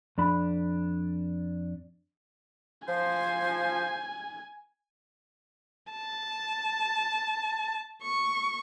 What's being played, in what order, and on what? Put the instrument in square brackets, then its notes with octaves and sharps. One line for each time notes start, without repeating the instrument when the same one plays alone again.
[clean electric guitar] F2 D4 B5
[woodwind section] F3 C5 [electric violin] G#5
[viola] A5
C#6